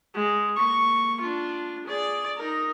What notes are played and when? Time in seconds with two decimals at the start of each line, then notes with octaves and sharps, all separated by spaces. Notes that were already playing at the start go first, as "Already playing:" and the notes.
0.14 G#3
0.56 A#3 C#6
1.20 D4 F4
1.86 G#4 D5
2.37 D#4 A#4